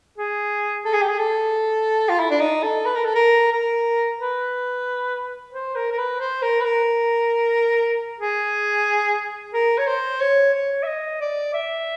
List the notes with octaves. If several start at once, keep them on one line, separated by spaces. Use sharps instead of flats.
G#4
A4
G#4
G4
G#4
A4
F4
E4
D4
D#4
A4
B4
A#4
A4
A#4
A#4
B4
C5
A#4
A#4
B4
C5
A#4
B4
A#4
G#4
A#4
C#5
C5
C#5
C#5
E5
D#5
D5
E5